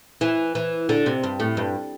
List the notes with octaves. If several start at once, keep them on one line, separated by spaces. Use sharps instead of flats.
E3
E3
D3
C3
G2
A2
G2